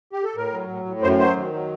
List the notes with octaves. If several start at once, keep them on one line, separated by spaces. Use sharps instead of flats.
G4
A4
A2 A#4
F#3
A2
A2
F#2 C5
F#3 C5
D#3
F#3